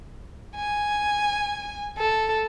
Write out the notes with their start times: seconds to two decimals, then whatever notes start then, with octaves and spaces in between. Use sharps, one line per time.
0.56 G#5
1.98 A4